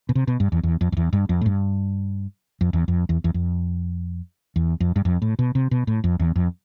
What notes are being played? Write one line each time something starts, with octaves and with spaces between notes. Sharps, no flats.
B2
C3
B2
G2
E2
E2
F2
F2
E2
G2
F2
A2
G2
F2
E2
F2
E2
E2
F2
E2
F2
G2
F2
A2
B2
C3
B2
A2
F2
E2
F2